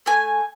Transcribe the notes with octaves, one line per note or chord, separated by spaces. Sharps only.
A3 G#5